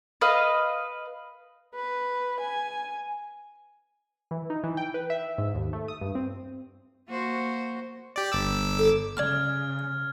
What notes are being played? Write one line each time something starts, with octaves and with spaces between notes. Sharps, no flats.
B4 D#5 F5
B4
G#5
E3
D#4
E3
G5
B4
E5
G#2
D#2
A3
D#6
G2
C4
A#3 F#4 C5
G4 D5
G1 D6 E6
A4
C#3 D5 A5 C#6 F6 G#6